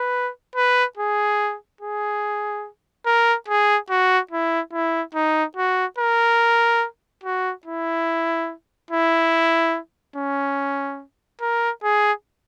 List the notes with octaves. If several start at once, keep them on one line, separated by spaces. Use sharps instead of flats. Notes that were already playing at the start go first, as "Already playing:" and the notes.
Already playing: B4
B4
G#4
G#4
A#4
G#4
F#4
E4
E4
D#4
F#4
A#4
F#4
E4
E4
C#4
A#4
G#4